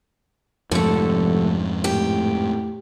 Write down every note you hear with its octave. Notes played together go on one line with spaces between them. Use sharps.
F1 F2 G#2 D3 A3
A2 G4